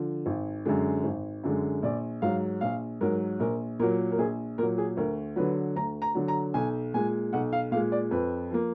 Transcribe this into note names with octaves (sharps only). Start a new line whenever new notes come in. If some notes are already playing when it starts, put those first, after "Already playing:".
Already playing: D3 F3
G#1
F#2 D3 G#3
G#1
F#2 D3 G#3
A#1 D5
G#2 F#3 F5
A#1 F5
G#2 F#3 A#4
A#1 A#4
A#2 F#3 A#4
A#4
A#1 G#4
A#2 F#3 A#4
G#4
D2 A#4
D3 F#3 B4
D2 A#5
A#5
D3 F#3
A#5
B1 G#5
A#2 G#3 G#5
B1 F#5
F5
A#2 G#3 F5
D5
F2 B4
F3 A#3